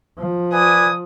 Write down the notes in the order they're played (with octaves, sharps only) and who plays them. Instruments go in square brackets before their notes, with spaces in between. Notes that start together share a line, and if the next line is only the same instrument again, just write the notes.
[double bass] F3
[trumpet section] B4 D5 G#5 [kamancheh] D#6